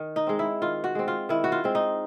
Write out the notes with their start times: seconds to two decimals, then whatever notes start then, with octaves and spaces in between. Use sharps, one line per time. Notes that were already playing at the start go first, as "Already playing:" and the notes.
Already playing: D#3
0.16 D#4
0.27 G#3 C4
0.39 E4
0.62 D#3 F4
0.84 F#4
0.95 G#3 C4
1.08 F4
1.29 D#3 E4
1.44 F#4
1.52 F4
1.64 G#3 C4
1.75 D#4